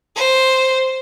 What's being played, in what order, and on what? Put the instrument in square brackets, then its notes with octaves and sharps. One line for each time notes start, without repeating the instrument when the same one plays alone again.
[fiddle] C5